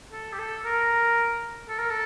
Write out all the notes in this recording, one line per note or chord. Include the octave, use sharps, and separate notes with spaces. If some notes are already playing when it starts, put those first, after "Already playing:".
A4
G4
A4
A#4
A4
A#4
A4